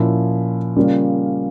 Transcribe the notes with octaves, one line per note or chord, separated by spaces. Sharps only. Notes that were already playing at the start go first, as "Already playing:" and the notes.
Already playing: A#2 F3 C#4 E4
C#3 G3 A#3 C#4 F4